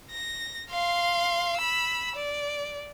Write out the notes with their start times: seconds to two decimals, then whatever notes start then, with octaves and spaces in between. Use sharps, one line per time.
0.11 A#6
0.70 F5 C6
1.57 B5 E6
2.16 D5